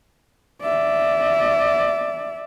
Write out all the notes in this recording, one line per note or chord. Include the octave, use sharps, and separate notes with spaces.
D5 E5